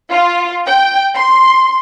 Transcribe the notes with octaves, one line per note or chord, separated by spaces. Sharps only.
F4
G5
C6